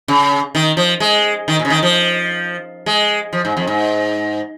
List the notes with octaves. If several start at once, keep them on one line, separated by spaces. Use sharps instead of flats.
C#3
D#3
F3
G#3
D#3
A#2
C#3
D#3
F3
G#3
F3
G#2
F2
G#2